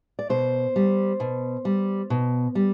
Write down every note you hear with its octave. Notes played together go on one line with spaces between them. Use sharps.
D5
B2 C5
G3
B2
G3
B2
G3